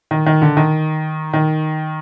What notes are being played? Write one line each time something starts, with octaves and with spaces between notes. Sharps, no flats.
D#3
D#3
D3
D#3
D#3